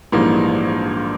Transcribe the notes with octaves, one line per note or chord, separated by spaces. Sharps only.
A#1 G#2 E3 G3 A#3